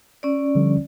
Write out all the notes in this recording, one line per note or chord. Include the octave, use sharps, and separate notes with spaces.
C#4 D5
D3 F3 G3